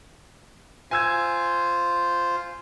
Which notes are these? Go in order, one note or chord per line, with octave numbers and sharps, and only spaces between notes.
F4 C5 G#5 E6 G#6